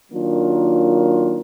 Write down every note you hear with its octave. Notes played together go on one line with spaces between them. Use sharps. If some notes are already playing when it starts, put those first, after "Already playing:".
D#3 F#3 A#3 D4 F4